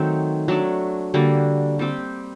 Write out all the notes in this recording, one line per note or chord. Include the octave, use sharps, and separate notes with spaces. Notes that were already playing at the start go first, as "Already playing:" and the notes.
Already playing: D#3 F#3 A3 C4 D#4
F#3 A3 D4
D3 G3 A#3 F#4
G3 C4 G4